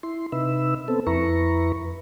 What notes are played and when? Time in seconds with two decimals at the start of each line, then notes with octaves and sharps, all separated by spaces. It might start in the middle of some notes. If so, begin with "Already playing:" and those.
0.03 E4 C6
0.32 C3 D#4 B4 E5 E6
0.88 B3 C4 A4
1.07 F2 E4 B4 A#5 C#6